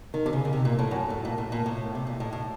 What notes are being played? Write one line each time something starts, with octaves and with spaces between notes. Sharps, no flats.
D#3
C3
C#3
C#3
C3
A#2
A2
F#2
A2
A#2
A2
A#2
A2
C3
A#2
A2
A2